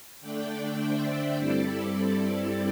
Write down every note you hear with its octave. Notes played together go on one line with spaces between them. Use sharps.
D3 A3 D4 D5 G5
C5 E5
G2 G3 C4 E4 A4 D5
A4
A4